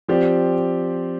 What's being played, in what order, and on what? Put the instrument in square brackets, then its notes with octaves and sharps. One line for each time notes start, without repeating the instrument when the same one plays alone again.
[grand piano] F3 C4 G4 D5